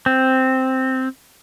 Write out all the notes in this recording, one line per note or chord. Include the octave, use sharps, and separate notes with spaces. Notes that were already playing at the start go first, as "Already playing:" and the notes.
C4